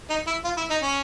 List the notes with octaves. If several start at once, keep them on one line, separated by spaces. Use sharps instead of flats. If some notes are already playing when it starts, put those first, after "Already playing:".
D#4
E4
F4
E4
D#4
C#4